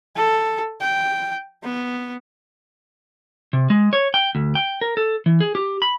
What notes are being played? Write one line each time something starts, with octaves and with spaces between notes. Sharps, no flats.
A4
G5
B3
C3
G#3
C#5
G5
D2
G5
A#4
A4
E3
G#4
G4
B5